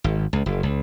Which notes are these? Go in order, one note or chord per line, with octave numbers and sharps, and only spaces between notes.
G#1
C#2
F#1
C#2